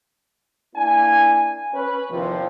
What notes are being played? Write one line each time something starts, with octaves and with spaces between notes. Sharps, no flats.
A#3 D4 E4 G#5
C#4 B4
E2 C3 D#3 F3